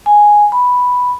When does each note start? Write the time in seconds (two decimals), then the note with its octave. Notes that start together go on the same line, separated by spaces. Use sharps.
0.06 G#5
0.52 B5